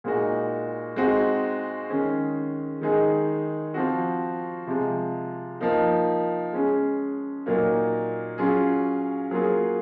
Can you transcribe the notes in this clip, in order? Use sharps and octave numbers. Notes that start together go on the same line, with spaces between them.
A#2 G#3 D#4 F#4
G#3 C4 D#4 F#4
D#3 G#3 C#4 G#4
D#3 G#3 D#4 G#4
F3 C4 F#4
C3 F3 G#3
F3 A#3 D#4
G#3 C#4 G#4
A#2 F#3 A#3 D#4
F#3 C#4 F4 G#4
F#3 A#3 F4 G#4